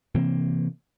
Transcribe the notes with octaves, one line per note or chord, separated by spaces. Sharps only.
C3 E3 A#3 C4